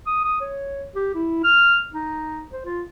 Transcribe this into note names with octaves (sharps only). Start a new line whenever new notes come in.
D#6
D#6
C#5
G4
E4
F6
D#4
C5
F4